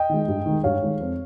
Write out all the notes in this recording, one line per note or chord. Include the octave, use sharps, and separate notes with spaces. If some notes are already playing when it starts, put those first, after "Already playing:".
Already playing: D#5 G5
D#3 G#3
G2
D#3 G#3
G2 C#5 F5
D#3 G#3
F2